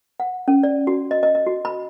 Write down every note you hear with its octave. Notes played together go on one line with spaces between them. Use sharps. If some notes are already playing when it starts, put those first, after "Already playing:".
F#5
C#4
D5
F#4
D#5
D#5
D#5
F#4
B5